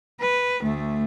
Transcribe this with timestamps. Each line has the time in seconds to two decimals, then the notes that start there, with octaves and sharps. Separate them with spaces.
0.21 B4
0.62 D2 A3